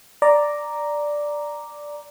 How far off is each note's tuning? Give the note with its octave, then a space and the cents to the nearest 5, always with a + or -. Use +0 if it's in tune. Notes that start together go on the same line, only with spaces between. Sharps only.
D5 +0 A#5 +0 D6 +0